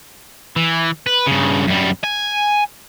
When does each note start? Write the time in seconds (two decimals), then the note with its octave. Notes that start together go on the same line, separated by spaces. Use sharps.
0.56 E3
1.07 B4
1.26 G2 C#3
1.67 F#2 G3
2.04 G#5